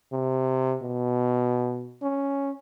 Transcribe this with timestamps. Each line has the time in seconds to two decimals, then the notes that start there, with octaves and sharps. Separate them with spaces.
0.12 C3
0.82 B2
2.02 C#4